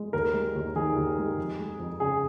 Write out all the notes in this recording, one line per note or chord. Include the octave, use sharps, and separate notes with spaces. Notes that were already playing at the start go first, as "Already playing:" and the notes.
Already playing: G#3
D#2 A#4
G#3
D#2
D#3 G#4
D#2
G#3
F2
G#3
F2
C#3 G#4